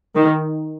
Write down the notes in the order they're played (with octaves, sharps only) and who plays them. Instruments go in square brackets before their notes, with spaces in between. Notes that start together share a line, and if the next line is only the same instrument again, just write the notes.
[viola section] D#3